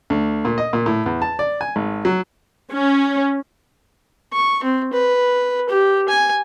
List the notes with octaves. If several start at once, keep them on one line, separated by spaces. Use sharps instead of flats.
D2
A#2
D#5
A#2
A2
E2
A5
D5
G#5
G#1
F#3
C#4
C#6
C4
B4
G4
G#5